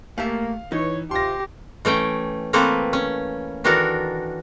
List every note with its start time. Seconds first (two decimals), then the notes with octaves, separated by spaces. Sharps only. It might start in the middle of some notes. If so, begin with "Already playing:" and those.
0.18 A3 A#3 G4 E5 F5
0.72 E3 D#4 B4 C#5
1.11 C3 F4 G4 C6 A#6
1.85 E3 A3 C#4 G5
2.53 E3 A3 A#3 C4 A4 B4
2.93 C#4
3.64 D#3 E3 D4 F#4 A4 A#4